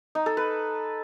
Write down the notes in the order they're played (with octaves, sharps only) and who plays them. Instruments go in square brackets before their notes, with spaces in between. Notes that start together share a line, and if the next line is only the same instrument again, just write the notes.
[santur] D#4
A4
B4